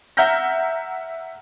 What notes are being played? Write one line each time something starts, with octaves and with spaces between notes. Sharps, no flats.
E5 F#5 A#5 F6 G6 A#6